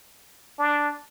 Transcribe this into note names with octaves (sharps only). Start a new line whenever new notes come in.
D4